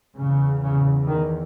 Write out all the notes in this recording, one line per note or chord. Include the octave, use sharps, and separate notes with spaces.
E2 C#3
C#3
D#3